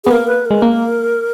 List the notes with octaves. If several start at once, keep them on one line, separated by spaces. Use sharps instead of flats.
B3 G#4
A#3 A#4
B4
G#3 A#4
A#3